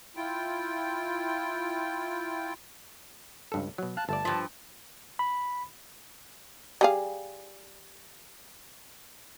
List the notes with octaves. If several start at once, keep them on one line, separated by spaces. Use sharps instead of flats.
E4 F4 G5
C#2 G2 A4
B2 F#3
F5 A5 F#6
G1 A3 D5 A5
G2 F3
B5
G3 G#4 F5